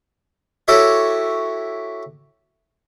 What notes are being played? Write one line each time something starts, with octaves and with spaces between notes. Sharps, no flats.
E4 F#4 G4 A4 C#5 E5